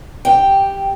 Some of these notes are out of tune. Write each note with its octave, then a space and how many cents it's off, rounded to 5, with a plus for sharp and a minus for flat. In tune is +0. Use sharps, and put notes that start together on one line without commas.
G4 +0 G5 +0